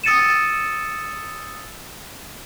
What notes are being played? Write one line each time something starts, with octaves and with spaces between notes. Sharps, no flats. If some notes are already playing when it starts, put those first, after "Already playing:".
D#6 E6 A6 C#7 D#7 E7